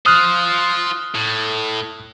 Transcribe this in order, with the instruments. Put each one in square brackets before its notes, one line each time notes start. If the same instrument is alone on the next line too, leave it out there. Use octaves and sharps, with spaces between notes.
[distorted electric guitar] F4 C5 [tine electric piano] D#6 F6 F#6
[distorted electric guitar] A2